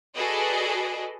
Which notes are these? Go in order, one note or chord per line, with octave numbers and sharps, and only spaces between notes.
F#4 G#4 A4 B4 D5 D#5